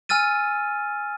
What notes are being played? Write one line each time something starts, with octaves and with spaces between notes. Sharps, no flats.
G#5 E6 F6 A6 D#7